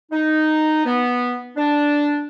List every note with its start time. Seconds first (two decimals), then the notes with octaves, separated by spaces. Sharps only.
0.12 D#4
0.86 B3
1.57 D4